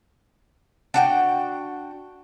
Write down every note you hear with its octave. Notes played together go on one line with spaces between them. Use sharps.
D4 F#4 G5